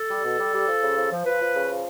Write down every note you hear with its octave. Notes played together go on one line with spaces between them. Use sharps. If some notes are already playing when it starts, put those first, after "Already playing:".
Already playing: A4
G3
B2
G3
G3
F3
C#3
F3
F3
F3 B4
F3
C#3
F3